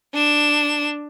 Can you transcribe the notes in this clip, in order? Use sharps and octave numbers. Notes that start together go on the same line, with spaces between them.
D4 E7